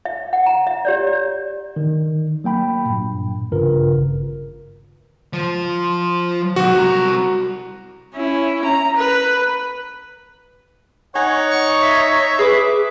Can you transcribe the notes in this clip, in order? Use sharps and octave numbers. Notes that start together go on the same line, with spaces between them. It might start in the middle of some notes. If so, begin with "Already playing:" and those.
E5
F#5
A#5
E5
G4 C#5 D5
D5
D#3
F#3 A#3 G5 B5
G2 A#2
A1 G2 C#3 F4 A#4 B4
G#1
F3
B1 F#4 G4
C2 A#5
C#4 E4
A#5
B4
D#4 C#5 F#5 G#5
C#6
E5
G#4 B4 D6